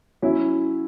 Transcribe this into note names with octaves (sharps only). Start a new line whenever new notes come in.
F#3 C#4 E4